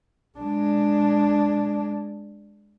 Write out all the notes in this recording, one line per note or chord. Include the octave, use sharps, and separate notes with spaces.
G#3 D4